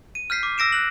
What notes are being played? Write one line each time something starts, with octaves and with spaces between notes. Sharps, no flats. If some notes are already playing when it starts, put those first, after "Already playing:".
D#7
F6 G6 B6 C7
D6
E6 A#6 D7 E7
F#6 F#7